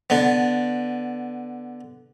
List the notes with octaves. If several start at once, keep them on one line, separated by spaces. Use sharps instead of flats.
D3 B3